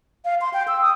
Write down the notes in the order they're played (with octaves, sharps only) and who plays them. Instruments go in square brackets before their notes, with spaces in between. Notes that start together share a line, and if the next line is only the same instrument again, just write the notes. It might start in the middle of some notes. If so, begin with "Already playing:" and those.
[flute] F5
C6
G5
E6
D#6